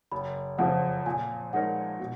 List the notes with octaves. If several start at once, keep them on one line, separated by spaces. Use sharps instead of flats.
F#1 B5
F2 C#3 F3 F#5
A#2 G#5
G#3 D#4 A#4 C#5 F#5
B2